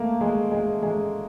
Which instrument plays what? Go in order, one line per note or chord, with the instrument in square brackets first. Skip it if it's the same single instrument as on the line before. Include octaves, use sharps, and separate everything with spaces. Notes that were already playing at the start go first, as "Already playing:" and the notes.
Already playing: [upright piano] A3 A#3
G#3
G#3
G#3